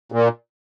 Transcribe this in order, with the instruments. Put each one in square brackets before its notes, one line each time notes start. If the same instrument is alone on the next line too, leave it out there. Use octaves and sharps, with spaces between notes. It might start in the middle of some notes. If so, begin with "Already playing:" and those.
[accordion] A#2